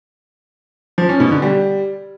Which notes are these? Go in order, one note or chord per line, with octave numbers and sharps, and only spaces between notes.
F3
C#4
B2
D3
G3